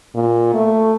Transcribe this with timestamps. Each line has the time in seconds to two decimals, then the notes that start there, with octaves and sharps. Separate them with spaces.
0.15 A#2
0.55 A3